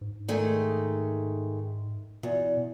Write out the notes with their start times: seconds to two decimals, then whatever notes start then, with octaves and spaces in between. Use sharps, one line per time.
0.01 G#2
0.28 D#3 G#3 A3
2.23 E2 B2